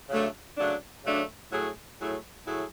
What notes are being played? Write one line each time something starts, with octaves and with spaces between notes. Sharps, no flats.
C#3 F#3 A3 D4
C#3 F#3 A3 D4
C#3 F#3 A3 D4
A2 F#3 A3 E4 G#4
A2 F#3 A3 E4 G#4
A2 F#3 A3 E4 G#4